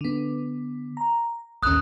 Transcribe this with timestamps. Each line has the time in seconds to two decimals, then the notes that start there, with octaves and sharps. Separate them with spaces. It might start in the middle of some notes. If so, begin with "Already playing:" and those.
0.01 D3 B3
0.97 A#5
1.63 A1 D#2 C#4 D#6 F#6